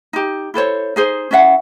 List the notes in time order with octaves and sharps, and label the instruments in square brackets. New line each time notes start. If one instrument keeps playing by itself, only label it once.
[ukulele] D#4 G4
E4 A4 C5 C#5
D#4 G#4 C5
C#4 E4 E5 F#5